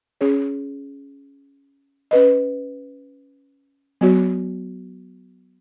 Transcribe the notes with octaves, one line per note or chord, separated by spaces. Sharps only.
C#4 G#4 C#5
C#4 B4 D#5
F#3 B3 F#4 C#5